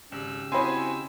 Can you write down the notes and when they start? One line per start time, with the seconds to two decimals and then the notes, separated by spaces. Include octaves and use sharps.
0.12 G#1 C#3 G4 E6
0.52 C4 E4 F#4 C5 D#5 G#5 B5 C6